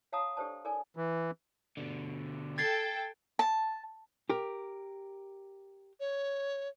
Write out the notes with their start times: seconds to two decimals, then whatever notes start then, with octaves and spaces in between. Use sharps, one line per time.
0.12 C#5 F5 F#5 A5 A#5 D#6
0.37 D4 G4 A4 C5 D5 A5
0.65 A4 A#4 D5 G#5
0.96 E3
1.77 B2 D3
2.58 A4 G5 G#6 A6 C7
3.39 A5
4.30 G4 A#4
6.00 C#5